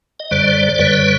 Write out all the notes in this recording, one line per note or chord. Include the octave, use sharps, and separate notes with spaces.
D#5
F#2 D3 G3 C5 D5
C5
F#2 D3 G3 B4 C#5